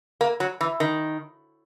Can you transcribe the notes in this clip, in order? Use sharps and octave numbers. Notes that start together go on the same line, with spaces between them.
A#3
F#3
E3
D#3